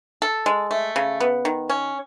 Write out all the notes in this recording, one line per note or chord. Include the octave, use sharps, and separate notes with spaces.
A4
G#3
A3
C#3
B3
D#3
C#4